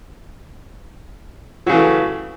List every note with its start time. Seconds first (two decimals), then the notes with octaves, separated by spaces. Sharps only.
1.66 F#3
1.69 C#3
1.72 E3
1.75 A3